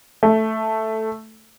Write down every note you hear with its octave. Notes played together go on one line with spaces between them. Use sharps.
A3